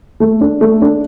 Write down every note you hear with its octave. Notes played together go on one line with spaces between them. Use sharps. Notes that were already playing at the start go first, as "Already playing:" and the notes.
A3
D4
A3
D4